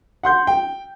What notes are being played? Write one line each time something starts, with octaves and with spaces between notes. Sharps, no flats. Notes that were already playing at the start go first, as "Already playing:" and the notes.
F#5 C6 G6
G5